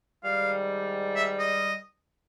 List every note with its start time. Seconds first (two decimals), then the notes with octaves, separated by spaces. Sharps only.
0.23 G#2 D#3 G3 F5
1.16 E5
1.39 D#5